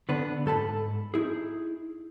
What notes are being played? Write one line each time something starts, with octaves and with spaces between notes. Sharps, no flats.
D3 B3 D4 B4
G#2 A4 A5 B5
D#4 E4 G#4